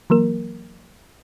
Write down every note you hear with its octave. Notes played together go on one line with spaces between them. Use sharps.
E3 F#3 A#3 A#4